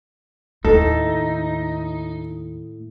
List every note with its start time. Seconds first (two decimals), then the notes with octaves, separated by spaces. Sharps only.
0.65 D#2 A2 D#4 A4